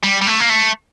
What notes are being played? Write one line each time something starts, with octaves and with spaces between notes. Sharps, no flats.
G3
G3
A3
A#3
A3